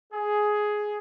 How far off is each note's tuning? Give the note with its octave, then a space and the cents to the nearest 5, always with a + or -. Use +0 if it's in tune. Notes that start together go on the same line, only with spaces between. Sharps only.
G#4 +10